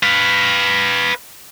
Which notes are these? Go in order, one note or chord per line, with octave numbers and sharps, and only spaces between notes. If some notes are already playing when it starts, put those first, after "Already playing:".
B4 F5